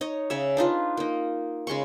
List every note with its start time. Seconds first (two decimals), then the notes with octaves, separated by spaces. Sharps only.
0.01 D#4 C#5 D#5
0.30 C#3 C#5 E5
0.57 D4 D#4 F4 B4
0.97 A#3 D#4
1.67 C#3 G#3 C6 C#6